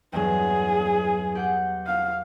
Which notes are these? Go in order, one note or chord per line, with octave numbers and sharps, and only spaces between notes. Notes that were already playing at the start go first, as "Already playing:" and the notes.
E2 G2 F#3 G#4
G4 F#5 G6
F5